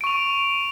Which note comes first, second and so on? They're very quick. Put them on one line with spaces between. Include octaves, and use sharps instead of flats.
D7 C#6 F7